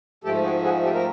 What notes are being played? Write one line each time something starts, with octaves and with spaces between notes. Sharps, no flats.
G#2 F3 A3 G4 A4
F#4 G#4
F#4 G#4
G4 A4
A#4